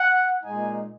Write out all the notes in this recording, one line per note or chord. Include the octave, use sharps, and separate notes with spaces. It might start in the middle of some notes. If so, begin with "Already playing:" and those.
Already playing: F#5
A#2 G#3 D#4 G#5